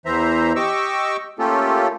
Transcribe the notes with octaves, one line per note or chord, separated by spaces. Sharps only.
E2 E3 C5 E5 A#5
G4 D#5 C#6 D6 E6
A3 A#3 C#4 F4 G4 A4